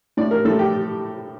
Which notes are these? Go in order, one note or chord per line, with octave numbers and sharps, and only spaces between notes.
A2 D5
A#4
A2 A4
G4